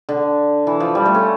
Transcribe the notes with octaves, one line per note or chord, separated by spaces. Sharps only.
D3
E3
F3
G3
A3
C#4